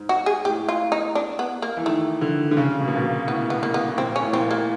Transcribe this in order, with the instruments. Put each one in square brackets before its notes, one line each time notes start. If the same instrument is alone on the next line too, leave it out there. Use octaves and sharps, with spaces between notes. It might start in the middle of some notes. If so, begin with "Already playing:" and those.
Already playing: [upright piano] G#2
[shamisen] F#4
G#4
[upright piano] A2 [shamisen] G4
[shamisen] F4
D#4
D4
B3
A#3
[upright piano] E3
[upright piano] D#3 [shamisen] A3
[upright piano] D3
D3
C#3
B2
A#2
B2
A#2
[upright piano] A2 [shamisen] B3
[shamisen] B3
A#3
B3
[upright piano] A2
[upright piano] A#2 [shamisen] C4
[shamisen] C#4
[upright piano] A2
[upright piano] A#2 [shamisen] C4
[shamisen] A#3